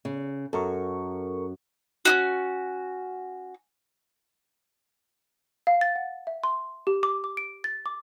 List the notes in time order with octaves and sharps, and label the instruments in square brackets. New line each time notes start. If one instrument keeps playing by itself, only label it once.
[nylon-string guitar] C#3
[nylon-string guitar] F#2 [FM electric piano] A4 A#4 C#6
[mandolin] C#4 D#4 F#4
[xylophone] F5
A6
F#5
E5
C6
G4
D6
D6
D7
A6
D6